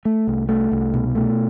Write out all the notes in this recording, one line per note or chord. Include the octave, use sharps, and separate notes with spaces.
A3
C2
A3
C2
B2
A3